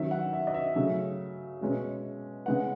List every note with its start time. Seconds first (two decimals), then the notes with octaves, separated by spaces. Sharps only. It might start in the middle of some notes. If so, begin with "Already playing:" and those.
Already playing: D#3 F#3 C#4 E5
0.11 F#5
0.33 E5
0.47 D#5
0.54 E5
0.76 C#3 F#3 A3 E5
1.61 B2 G#3 C#4
2.46 C#3 G#3 B3 F#5